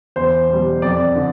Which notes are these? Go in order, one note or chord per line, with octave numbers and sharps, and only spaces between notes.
E2 C5
B2 G3
F2 D5
D3